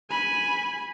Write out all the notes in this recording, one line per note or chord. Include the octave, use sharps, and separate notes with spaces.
G#5 B5